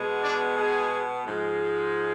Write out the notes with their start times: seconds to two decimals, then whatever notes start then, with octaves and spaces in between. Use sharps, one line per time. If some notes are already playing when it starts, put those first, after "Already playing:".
Already playing: B2 G#3 B3
0.22 D4 D5
0.56 G#3 G#4
1.26 G#2 F3 G#3